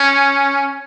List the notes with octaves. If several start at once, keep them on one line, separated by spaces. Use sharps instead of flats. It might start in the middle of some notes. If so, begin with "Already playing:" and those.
Already playing: C#4